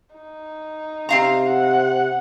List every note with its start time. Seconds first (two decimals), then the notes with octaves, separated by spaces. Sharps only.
0.15 D#4
1.09 C3 C4 F5 A#5
1.45 F#5